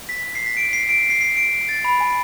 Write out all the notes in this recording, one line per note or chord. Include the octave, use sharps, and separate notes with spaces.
B6
C7
B6
D7
C7
D7
C7
C7
C7
D7
A6
B5
G#5